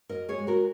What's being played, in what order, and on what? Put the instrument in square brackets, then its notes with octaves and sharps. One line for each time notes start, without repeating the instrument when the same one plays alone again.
[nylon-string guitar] F#2 A#4 D#5
G#4 C#5
G#3
F#4 A#4